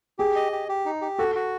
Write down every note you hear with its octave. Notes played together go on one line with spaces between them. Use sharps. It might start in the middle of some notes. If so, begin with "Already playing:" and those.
G4 G#4
D#5
G4
G4
D#4
G4
F#4 A4
F#4